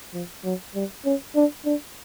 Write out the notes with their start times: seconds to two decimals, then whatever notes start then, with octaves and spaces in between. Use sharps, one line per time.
0.14 F3
0.45 F#3
0.75 G3
1.05 C#4
1.36 D4
1.65 D4